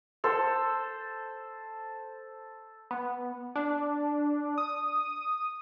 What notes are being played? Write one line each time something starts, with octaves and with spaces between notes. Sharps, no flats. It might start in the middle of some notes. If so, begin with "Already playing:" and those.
A4 C5
B3
D4
D#6